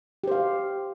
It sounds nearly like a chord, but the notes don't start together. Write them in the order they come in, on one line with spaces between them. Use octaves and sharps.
G4 C5 F5